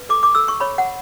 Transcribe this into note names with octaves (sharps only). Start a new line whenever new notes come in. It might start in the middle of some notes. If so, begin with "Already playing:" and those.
Already playing: B4
A4 D6
D6
A4 E6
C#6
C#5 B5
F#5